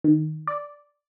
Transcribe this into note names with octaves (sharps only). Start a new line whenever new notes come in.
D#3
D5